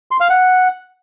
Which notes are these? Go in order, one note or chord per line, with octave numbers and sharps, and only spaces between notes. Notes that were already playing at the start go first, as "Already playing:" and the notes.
C6
F5
F#5